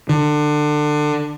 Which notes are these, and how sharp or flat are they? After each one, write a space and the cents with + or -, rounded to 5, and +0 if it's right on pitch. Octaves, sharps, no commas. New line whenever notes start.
D3 +25